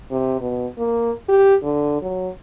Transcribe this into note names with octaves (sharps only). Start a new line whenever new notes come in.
C3
B2
A#3
G4
D3
F#3